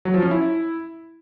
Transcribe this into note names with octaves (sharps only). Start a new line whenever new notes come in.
F#3
F3
C#4
E4